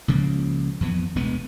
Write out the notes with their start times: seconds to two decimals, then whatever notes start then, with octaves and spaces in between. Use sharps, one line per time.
0.08 C#2 C#3 F3 A#3
0.81 F2 E3 B3
1.15 E1 D2 G#3 B3